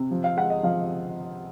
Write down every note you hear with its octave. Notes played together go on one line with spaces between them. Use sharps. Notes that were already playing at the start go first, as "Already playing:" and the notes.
Already playing: C3
F3
F5
G#3 F#5
D#5
F3 F5